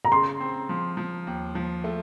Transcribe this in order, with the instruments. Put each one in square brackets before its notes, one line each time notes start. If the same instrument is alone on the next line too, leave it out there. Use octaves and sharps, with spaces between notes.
[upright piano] A#5
[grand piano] C#3 [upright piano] C6
[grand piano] C4
F3
F3
D#2
F3
A3